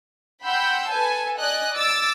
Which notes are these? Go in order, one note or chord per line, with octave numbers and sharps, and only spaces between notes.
F#5 G5 B5 C6 E6 G6
A4 B4 G#5 A5
D5 D#5 G#5 F#6
D6 E6 A6